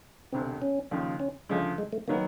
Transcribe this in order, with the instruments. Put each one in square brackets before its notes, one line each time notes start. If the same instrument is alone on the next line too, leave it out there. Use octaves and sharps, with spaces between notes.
[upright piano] E1 D2 C3 [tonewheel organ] C4
[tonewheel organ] C#4
[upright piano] D#2 C#3 F3
[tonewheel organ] C#4
[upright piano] D2 C#3 F3 [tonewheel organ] G#3
[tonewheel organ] G#3
A3
[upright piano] D#3 F#3 B3 [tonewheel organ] A#3